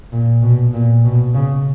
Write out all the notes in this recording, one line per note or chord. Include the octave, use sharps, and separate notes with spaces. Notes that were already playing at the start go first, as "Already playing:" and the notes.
A#2
B2
A#2
B2
C#3